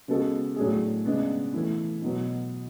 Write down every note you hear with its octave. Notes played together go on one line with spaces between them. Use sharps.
C#3 G#3 B3 F#4 A4
A2 F#3 A3 D4 G#4
C#3 G#3 B3 D4
E3 A3 E4
B2 F#3 B3